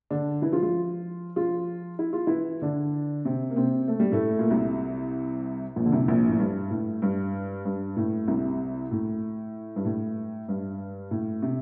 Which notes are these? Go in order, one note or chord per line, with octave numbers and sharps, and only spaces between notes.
D3 D4
E3 E4
F3 F4
F3 F4
F3 F4
E4
F4
E3 E4
D3 D4
C3 C4
A#3
C3 C4
A3
G3
A2 A3
A#2
C2 C3
A#1 A#2
D3
C2 C3
A#1 A#2
A2
G2
A2
G2
G2
A2
C2 C3
A2
G2
A2
G2
A2
C3